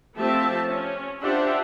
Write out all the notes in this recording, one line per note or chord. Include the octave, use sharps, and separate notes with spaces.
F3 A3 C4 G4 E5 A5
C#4
D4 F4 G4 C5 E5 F#5